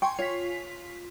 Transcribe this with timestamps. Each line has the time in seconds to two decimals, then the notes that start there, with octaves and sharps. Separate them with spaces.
0.02 G5 G#5 C6 C#6
0.19 F4 C#5 B6